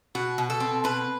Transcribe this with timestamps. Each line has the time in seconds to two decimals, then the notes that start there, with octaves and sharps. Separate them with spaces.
0.15 B2 F#4
0.38 B2
0.50 A4
0.60 C4
0.84 B2 B4